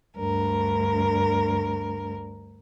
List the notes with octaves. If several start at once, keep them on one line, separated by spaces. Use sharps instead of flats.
D2 G2 A#4